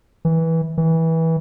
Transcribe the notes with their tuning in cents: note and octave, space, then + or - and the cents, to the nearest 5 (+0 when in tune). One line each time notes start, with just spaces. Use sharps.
E3 -15
E3 -20